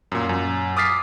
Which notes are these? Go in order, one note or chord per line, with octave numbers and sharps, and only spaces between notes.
F#2 A#2
F#2
D6 D#6 F6 A6 B6 C7